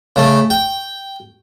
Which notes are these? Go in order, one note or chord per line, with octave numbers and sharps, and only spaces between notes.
C#3 A3
G5